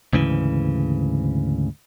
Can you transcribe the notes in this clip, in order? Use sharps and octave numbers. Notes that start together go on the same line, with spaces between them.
D2 G#2 C#3 E3